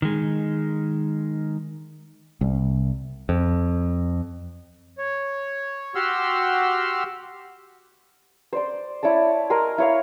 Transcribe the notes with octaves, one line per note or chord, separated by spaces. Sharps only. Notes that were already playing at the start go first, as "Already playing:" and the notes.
D#3 G#3
C2
F2
C#5
F#4 G4 F#5 C6 E6 F6
C5 D5 C6
E4 C#5 D5 A5
A#4 D#5 G#5 C6
E4 C#5 F5